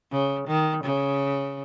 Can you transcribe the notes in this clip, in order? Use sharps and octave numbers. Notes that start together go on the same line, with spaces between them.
C#3
D#3
C#3